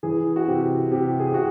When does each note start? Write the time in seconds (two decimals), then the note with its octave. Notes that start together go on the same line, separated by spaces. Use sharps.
0.03 E3 G#4
0.36 F#4
0.47 C3 G4
0.91 C3 G4
1.20 G#4
1.27 G4
1.34 C3 F#4